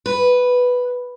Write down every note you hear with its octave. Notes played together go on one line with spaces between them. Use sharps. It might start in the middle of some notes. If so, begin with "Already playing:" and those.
B4